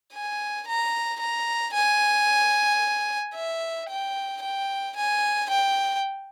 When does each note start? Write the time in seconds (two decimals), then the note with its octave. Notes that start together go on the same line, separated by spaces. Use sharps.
0.13 G#5
0.67 A#5
1.20 A#5
1.73 G#5
3.35 E5
3.89 G5
4.42 G5
4.96 G#5
5.49 G5